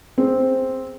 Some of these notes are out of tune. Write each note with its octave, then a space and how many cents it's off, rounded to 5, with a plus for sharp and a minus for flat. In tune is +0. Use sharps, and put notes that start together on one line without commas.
C4 +0 G#4 +0